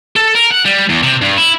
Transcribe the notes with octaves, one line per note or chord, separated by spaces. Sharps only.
A4
A#4
F#5
G3
E2
C3
G2
E4